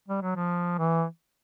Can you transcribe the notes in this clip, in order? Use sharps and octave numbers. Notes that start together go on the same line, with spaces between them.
G3
F#3
F3
E3